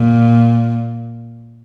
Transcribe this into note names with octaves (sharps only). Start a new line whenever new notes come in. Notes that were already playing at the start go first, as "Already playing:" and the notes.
Already playing: A#2